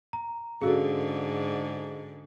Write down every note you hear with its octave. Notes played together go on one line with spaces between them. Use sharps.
A#5
G#2 D3 C#4 F#4 G#4 A4 F5 E6